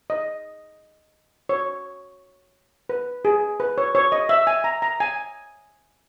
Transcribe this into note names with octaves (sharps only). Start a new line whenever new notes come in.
D#5
C#5
B4
G#4
B4
C#5
C#5
D#5
E5
G#5
A#5
A#5
G#5